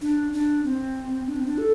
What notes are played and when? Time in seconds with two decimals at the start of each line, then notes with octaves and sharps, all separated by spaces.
0.01 D4
0.33 D4
0.65 C4
1.27 D4
1.36 C4
1.46 D4
1.58 A4